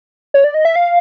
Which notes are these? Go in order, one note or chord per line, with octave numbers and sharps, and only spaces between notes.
C#5
D5
D#5
E5
F5